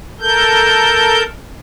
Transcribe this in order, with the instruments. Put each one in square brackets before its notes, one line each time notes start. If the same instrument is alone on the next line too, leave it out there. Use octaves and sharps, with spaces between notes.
[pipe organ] A4 A#4 G6